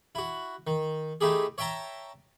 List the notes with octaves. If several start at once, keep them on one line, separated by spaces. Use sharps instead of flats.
E4 F#4
D#3
A3 D#4 E4 G4 G#4
C#5 E5 G5 A5 A#5